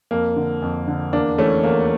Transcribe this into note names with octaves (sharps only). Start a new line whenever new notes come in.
F2 A#3
D3
F2
D3
E2 A#3 D4
E3 A3 C#4
E2 A#3